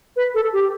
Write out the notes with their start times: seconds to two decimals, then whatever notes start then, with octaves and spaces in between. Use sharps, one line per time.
0.16 B4
0.34 A4
0.53 G4